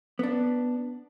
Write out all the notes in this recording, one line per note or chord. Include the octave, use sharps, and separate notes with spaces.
B3 D4